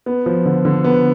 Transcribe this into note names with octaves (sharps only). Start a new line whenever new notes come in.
B3
F3
D3
D3
B3